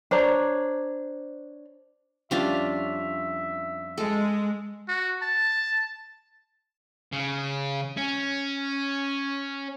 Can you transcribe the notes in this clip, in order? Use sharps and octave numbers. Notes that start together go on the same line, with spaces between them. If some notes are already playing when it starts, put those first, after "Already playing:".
D4 C5 C#5 A#5
F2 G3 C#4 D4 F4 E5 F5
G#3 A4
F#4
A5
C#3
C#4